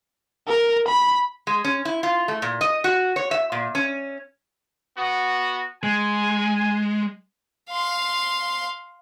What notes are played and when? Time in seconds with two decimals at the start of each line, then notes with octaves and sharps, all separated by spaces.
0.48 A#4
0.89 B5
1.47 G#3
1.65 C#4
1.85 E4
2.03 F4
2.28 A3
2.42 A#2
2.61 D#5
2.84 F#4
3.16 C#5
3.31 E5
3.52 A#2
3.75 C#4
4.98 B3 F#4
5.83 G#3 G#5
7.70 F5 C6